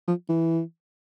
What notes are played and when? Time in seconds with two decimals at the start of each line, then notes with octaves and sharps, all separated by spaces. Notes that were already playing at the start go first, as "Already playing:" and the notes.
0.07 F3
0.29 E3